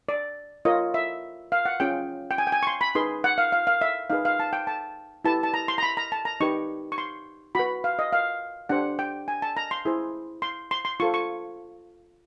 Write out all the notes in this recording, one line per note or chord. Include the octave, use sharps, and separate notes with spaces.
D5
F4 A#4 C#5 D#5
E5
F5
F#5
C#4 F4 G#4 G5
G5
G#5
G5
G#5
C#6
C6
B5
D#4 G#4 B4 C6
F#5
F5
F5
F5
E5
D#4 G#4 B4 F5
F5
A5
G5
A5
E4 G4 B4 A5
A5
A#5
C6
A#5
B5
A#5
A5
A#5
D#4 G4 B4 C#6
C#6
C6
F#4 B4 B5
F5
D#5
F5
D4 G4 C5 F#5
G5
G#5
A5
A#5
C6
E4 G#4 C5
C6
C6
C6
F4 A4 C5 C#6
C#6